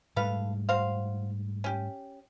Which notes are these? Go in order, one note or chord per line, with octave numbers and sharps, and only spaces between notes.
G#2 G3 A3 A4 B4 F5
F#4 C5 F5
C#4 G4